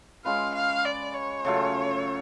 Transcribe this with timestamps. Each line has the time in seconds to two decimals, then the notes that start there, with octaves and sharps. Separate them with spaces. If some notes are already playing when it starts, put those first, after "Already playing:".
0.25 G#3 C#4 F4 B4 F5
0.55 F5
0.85 D5
1.14 C#5
1.45 C#3 F#3 A3 F4